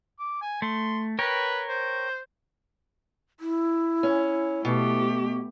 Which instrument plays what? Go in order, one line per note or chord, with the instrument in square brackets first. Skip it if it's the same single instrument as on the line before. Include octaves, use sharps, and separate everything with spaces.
[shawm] D6
G#5
[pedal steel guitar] A3 [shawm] C6
[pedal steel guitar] A#4 C#5 G5 [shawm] B4
[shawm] C5
[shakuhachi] E4
[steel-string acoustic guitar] C#4
[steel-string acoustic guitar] B2 [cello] A3 G4